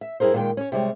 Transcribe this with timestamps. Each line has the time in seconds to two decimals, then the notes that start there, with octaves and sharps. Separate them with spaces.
0.01 E5
0.20 G2 E4 G#4 A#4 C5
0.33 A#2 D#3 G#3 A#4 G5
0.57 C#4 C#5
0.72 C3 G3 G#3 C#5